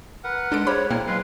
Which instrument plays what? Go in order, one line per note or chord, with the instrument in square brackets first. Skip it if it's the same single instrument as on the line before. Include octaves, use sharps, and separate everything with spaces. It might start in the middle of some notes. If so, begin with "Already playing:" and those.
[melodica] A#4 B4 F#5
[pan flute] G#3 [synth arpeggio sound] D4 A4 D7
[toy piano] G#4 C5 [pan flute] C#5 [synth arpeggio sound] B5
[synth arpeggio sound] A#2 A#3 [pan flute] E4 [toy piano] G5
[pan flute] F#3 [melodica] G#3 B4 F5